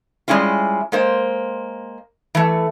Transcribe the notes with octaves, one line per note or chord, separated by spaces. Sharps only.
G3 G#3 C#4 E4 F4
G#3 A#3 C5
E3 A3